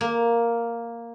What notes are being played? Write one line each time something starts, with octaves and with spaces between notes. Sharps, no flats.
A#3